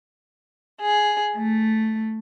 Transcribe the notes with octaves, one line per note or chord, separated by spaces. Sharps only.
G#4
A3